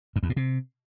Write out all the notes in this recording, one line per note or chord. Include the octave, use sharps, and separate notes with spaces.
F#2
E2
A2
C3